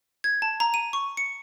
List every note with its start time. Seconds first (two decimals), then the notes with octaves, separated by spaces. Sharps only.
0.24 G#6
0.42 A5
0.60 A#5
0.74 D#7
0.93 C#6
1.17 C#7